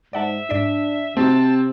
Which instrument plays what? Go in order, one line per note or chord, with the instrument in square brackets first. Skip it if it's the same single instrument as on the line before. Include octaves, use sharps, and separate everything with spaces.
[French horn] G#2 [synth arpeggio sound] D5 F#5 A5 [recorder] E5
[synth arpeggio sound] G#2 D5 B6 [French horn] D4
[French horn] C3 [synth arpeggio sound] A3 D#4 F#4 [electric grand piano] C4 [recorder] A5